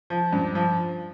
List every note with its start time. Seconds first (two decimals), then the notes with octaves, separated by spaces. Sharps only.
0.10 F3
0.33 G2
0.55 F3